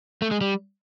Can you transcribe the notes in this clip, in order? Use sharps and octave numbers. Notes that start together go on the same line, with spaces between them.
A3
G#3
G3